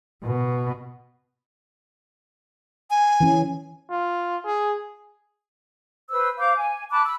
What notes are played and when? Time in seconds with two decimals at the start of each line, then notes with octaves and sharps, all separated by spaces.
0.23 B2
2.91 G#5
3.20 E3 C#4
3.91 F4
4.45 G#4
6.09 B4 C5 E6
6.38 C5 F5 D6 G6
6.57 G#5
6.91 A5 B5 D6 F#6
7.05 B5 E6